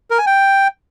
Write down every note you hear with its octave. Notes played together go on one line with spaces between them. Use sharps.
A#4
G#5
G5